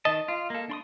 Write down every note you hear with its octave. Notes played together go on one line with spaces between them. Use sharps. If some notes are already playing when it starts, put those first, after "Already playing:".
D#3 D#5 A5
F4
A#3 A4
D4 C6 D#6